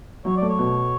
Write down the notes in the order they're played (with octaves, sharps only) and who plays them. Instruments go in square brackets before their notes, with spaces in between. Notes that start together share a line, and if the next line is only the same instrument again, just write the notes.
[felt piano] F#3 [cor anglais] C#5
[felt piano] A3 [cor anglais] D5
[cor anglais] C#5
[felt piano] B2